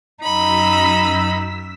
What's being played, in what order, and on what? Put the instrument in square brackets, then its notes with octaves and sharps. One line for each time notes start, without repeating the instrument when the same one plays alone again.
[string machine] F#2 E6 B6 [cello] D#4 [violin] B5